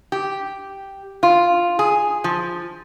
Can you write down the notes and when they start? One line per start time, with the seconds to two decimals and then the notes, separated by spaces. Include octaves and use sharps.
0.12 G4
1.23 F4
1.79 G#4
2.24 F3